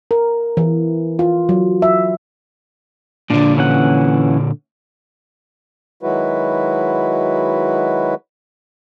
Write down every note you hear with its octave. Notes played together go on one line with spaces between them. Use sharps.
A#4
E3
F4
F#3
E5
A#2 D3 D4
E3 C#4 F#5
D#3 F#3 G#3 E4 F#4 B4